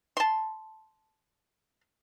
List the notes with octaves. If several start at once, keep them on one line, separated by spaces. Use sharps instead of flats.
A5 C6